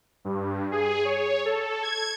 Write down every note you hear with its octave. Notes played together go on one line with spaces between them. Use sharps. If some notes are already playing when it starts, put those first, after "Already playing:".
G2
G#4
C#5
A4
G#6